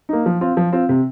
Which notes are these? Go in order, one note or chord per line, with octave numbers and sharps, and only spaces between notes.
A#3 D#4
F3
C4 F4
F3
C4 F4
C3